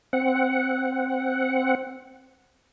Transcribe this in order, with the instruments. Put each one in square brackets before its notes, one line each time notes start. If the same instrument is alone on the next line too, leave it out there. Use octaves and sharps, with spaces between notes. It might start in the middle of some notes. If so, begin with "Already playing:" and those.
[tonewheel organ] C4 F#5